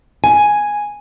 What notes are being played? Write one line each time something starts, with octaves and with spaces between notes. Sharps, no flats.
G#5